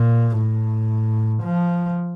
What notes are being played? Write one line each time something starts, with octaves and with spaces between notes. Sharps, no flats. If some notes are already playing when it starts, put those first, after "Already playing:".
Already playing: A#2
A2
F3